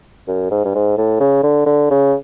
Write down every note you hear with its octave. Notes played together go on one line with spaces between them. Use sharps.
F#2
G#2
G2
G#2
A2
C#3
D3
D3
C#3